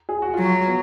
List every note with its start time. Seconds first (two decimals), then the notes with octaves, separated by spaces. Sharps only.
0.09 G#4
0.22 F#4
0.34 F#3 F4
0.45 F#4
0.67 B3